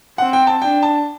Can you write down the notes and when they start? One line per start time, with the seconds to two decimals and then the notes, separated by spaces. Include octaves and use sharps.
0.18 C4 F#5
0.33 G5
0.47 A5
0.62 D4 G5
0.83 A5